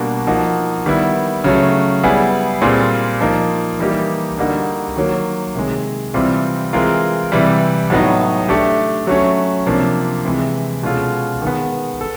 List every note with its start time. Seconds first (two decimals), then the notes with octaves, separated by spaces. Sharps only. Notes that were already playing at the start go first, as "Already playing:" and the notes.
Already playing: B2 G3 A#3 D4 F#4
0.27 F3 A#3 D#4 F#4
0.86 D#3 G3 B3 E4
1.44 C#3 F#3 A3
2.03 G3 B3 E4 G#4
2.62 A#2 G3 C4 F4 G#4
3.21 F3 A#3 D#4
3.79 E3 G3 A#3 D#4 G4
4.37 D3 G3 A#3 D#4 F#4
4.97 D#3 F#3 A#3
5.55 C3 D#3 G#3
6.14 C3 E3 G3 C4 F4
6.73 E3 G#3 C4 F4 A#4
7.32 C3 E3 G3
7.90 A2 F#3 B3 D#4
8.49 A3 D4 G4
9.07 F#3 A3 C#4
9.66 C3 F3 A#3 D4
10.25 C3 E3 G#3
10.83 B2 G#3 C#4 F4 A4
11.42 D#3 G#3 B3
12.01 A4